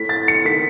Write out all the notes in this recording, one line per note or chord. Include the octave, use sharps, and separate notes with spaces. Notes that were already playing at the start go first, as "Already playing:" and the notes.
Already playing: A2 B6
A6
C#7
D#3 B6